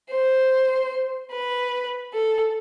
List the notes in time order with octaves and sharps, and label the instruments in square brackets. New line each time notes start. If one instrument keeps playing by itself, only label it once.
[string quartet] C5
B4
A4